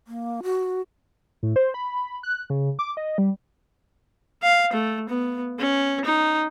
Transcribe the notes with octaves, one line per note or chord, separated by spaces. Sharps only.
A#3
F#4
A2
C5
B5
F#6
C#3
D6
D#5
G3
F5
A3
B3
C#4
D#4